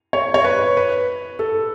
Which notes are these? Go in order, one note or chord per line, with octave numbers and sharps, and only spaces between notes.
C#5
C#5
B4
B4
A4